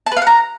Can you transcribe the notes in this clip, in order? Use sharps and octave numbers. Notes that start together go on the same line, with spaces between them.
A5
B4
F5
F#5
A#5